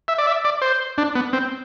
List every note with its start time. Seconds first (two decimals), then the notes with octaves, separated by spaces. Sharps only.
0.08 E5
0.18 D5
0.27 E5
0.45 D5
0.62 C5
0.98 D4
1.15 B3
1.33 C4